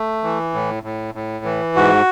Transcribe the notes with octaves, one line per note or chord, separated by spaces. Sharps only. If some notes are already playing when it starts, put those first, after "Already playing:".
Already playing: A3
E3
A2
A2
A2
E3
G#2 F#4